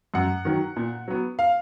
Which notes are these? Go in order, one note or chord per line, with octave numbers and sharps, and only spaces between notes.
F#2 F#5
D#3 F#3
A#2
F#3 B3
F5